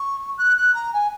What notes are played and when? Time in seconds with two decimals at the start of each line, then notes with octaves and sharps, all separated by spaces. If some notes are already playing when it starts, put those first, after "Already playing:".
Already playing: C#6
0.37 F#6
0.57 F#6
0.74 A#5
0.93 G#5